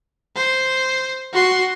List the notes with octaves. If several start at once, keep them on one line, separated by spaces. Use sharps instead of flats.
C5
F#4 C6